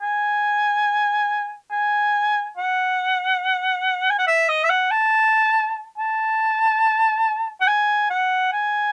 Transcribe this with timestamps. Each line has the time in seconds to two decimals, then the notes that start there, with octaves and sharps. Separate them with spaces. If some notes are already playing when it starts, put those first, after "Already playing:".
0.01 G#5
1.72 G#5
2.57 F#5
4.10 G#5
4.18 F#5
4.27 E5
4.49 D#5
4.64 E5
4.70 F#5
4.91 A5
5.98 A5
7.60 F#5
7.67 G#5
8.10 F#5
8.53 G#5